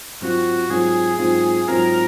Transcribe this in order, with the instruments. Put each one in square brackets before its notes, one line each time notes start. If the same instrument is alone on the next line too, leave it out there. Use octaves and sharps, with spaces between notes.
[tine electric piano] G#2 F#3 C4 F4 [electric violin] F#4
[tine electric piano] G#2 F#3 C4 F4 [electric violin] G#4
[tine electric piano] G#2 F#3 C4 F4
[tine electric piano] G#2 F#3 C4 F4 [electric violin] A#4